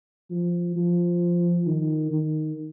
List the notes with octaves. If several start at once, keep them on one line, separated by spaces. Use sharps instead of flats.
F3
F3
D#3
D#3